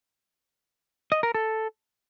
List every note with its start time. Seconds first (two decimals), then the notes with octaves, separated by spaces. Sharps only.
1.12 D#5
1.23 A#4
1.35 A4